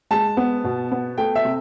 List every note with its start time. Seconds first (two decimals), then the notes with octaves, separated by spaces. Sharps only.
0.11 G#3 A5
0.37 B3
0.64 B2
0.92 B3
1.18 A3 G5
1.36 E5
1.45 C3